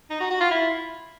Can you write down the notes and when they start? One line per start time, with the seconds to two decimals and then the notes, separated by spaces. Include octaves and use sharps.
0.10 D#4
0.20 F#4
0.30 F#4
0.40 F4
0.51 E4